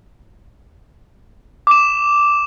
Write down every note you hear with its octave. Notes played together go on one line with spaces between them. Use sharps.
D6 E7